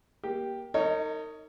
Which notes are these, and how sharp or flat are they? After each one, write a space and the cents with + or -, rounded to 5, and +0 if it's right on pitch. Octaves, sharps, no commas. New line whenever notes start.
A#3 +15 G4 +0
D#4 +0 A#4 -35 C#5 +15